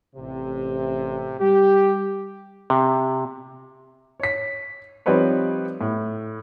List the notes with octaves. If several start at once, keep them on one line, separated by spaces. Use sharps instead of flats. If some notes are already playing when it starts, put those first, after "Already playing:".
A1 C3
G3 G4
C3
C#5 B6
F3 G3 C4 D#4 B4 C#5
A2